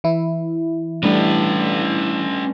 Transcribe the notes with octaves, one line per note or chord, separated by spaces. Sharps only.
E3 E4
G3 A3 C#4 D4 B4